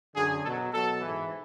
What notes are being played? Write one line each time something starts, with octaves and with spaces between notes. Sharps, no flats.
F#2 D3 F#3 G#4
B2 F#3 A4
B2 F#3 A4
G#2 E3